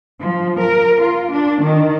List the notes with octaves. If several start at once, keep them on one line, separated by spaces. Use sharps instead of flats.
F3
A#4
F4
D4
D#3